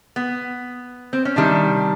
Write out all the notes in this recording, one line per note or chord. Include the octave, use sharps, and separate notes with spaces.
B3
C4
C#4
C3 D#3 G3 D4